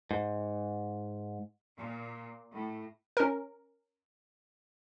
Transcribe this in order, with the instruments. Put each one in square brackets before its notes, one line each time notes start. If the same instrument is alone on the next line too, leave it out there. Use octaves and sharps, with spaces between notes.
[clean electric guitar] G#2
[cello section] A#2
A2
[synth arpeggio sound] C#4 A#4